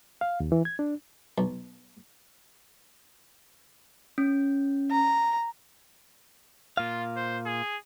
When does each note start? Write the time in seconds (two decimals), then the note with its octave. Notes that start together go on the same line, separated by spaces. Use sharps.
0.21 F5
0.40 D#2
0.52 E3
0.65 G#6
0.79 D4
1.38 B1
4.18 C#4
4.91 A#5
6.77 A#2 F4 F5
7.17 C5
7.46 G#4